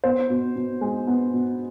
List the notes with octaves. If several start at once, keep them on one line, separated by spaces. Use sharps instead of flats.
B3 C5
B2
B2
G#3
B3
B2